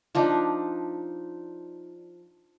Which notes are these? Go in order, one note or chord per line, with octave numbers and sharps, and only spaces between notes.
F3 D4 D#4